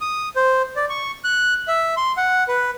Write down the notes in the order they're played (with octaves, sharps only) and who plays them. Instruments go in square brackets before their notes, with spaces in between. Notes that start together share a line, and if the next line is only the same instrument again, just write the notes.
[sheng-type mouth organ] D#6
C5
D5
C#6
F#6
E5
C6
F#5
B4